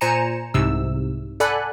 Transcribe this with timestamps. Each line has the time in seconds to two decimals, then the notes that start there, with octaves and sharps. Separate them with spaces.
0.01 A#2 C5 G#5 A#5 C#7 E7
0.54 C2 G#2 C3 E6
1.40 A4 D5 F#5 G#5 B5 F#6